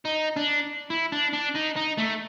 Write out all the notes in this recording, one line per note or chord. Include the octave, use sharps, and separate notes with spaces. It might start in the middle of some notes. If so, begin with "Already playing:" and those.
D#4
D4
E4
D4
D4
D#4
D#4
A3